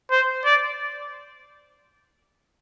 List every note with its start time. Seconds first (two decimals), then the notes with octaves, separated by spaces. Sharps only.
0.11 C5
0.45 D5